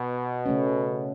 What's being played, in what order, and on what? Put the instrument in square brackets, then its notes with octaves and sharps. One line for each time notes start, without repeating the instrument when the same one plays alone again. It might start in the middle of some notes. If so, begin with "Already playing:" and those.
Already playing: [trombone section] B2
[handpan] C#3 A3 C#4